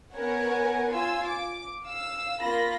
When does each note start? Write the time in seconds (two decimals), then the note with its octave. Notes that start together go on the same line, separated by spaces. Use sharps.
0.15 B3 A#4 C#5 F#5 G#5
0.91 F4 G#5 E6
1.27 D6
1.82 F5 E6
2.40 A#3 F4 B5 A#6